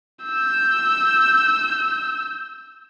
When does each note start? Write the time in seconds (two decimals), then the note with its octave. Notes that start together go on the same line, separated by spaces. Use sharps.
0.24 E6 G6